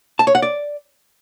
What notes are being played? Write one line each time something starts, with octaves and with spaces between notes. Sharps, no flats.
A5
C#5
F#5
D5